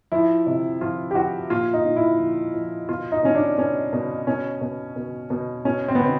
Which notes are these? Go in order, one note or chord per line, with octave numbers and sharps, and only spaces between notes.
F3 E4
C3
F3 F4
G4
F3 F#4
A#2 F4
D#4
A#2
E4
F3
F3
B2 F4
D#4
B2 C#4
D4
B2 C#4
B2
B2 C#4
B2
B2
B2
B2 C#4
C4
B3
B2 C4